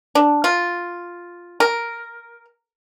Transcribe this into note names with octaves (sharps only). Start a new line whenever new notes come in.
D4
F4
A#4